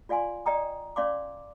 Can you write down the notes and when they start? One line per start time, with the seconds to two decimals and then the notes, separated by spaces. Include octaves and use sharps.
0.09 F4 D5 F5 G#5 C6
0.46 D5 D#5 G5 A#5 D#6
0.96 C#4 D5 F5 C6 D6